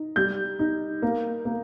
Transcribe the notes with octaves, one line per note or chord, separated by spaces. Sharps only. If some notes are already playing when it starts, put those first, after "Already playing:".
Already playing: D#4
G3 G6
D#4
A#3
A#3